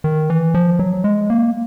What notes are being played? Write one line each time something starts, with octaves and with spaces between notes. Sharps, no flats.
D#3
E3
F3
F#3
G#3
A#3